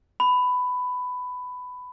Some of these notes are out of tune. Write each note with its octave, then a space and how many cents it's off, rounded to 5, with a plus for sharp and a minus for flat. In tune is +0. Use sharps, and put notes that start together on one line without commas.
B5 +15